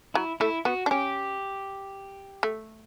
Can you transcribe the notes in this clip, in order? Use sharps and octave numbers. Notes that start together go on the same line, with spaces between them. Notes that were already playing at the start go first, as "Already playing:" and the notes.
F#3 E4
A3 E4
B3 F#4
D4
C#4 G4
A3